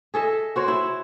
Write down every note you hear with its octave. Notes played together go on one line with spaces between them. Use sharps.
G#4 A4 D#5 E5
F#4 C5 C#5
E4